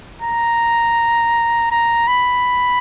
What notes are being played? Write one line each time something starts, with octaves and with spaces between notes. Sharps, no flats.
A#5
A#5
B5